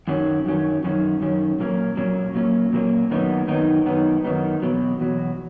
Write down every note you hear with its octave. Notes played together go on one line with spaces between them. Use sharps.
F#2 D#3 F#3 C#4
F#2 D#3 F#3 C#4
F#2 D#3 F#3 C#4
F#2 D#3 F#3 C#4
A#2 F#3 A#3 C#4
A#2 F#3 A#3 C#4
A#2 F#3 A#3 C#4
A#2 F#3 A#3 C#4
F#2 D#3 F#3 B3 D#4
F#2 D#3 F#3 B3 D#4
F#2 D#3 F#3 B3 D#4
F#2 D#3 F#3 B3 D#4
E2 B2 F#3
E2 B2 F#3